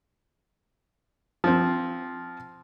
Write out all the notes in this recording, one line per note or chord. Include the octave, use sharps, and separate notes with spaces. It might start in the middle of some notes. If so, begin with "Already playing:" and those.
F3 C4